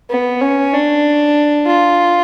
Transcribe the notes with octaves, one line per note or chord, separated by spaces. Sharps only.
B3
C#4
D4
F4